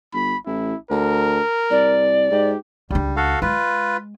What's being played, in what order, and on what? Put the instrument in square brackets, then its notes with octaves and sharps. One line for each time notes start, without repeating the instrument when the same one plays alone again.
[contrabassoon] G1 [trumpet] B5
[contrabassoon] A1 [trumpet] E4
[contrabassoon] D2 [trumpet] A#4
[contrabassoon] C2 [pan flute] D5
[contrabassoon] G#2 [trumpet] G4
[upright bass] C#2 D4 [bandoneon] G3
[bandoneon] F#4 A4 F5
[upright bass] G#3 [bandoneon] F4 B4